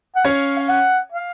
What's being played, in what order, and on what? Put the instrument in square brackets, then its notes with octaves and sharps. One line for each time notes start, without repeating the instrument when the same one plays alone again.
[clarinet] F#5
[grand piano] C#4 C#5 [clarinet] F5
[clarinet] F5
F#5
F5